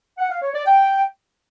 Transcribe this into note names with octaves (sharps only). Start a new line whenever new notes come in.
F#5
F5
C#5
D5
G5